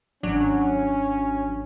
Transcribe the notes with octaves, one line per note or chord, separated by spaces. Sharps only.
G#1 F#3 C#4 D4